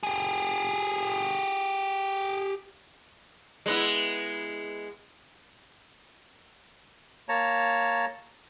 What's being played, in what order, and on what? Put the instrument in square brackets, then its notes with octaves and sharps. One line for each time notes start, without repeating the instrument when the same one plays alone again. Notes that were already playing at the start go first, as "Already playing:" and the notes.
[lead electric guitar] G4 G#4
[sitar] G#3 B3 E4
[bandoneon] A#3 C#5 A5 A#5